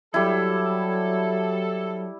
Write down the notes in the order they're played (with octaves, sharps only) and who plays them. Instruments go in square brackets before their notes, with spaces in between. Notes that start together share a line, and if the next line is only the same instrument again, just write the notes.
[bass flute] F#3 [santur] G3 E4 [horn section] A4